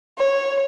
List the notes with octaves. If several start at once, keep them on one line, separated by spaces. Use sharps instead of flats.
C#5